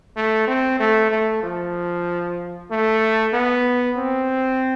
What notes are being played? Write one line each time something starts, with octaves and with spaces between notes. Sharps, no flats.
A3
C4
A3
A3
F3
A3
B3
C4